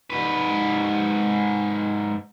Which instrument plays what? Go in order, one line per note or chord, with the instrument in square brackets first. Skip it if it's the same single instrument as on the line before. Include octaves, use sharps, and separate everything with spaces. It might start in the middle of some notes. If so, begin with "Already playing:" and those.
[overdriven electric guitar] G#2 B4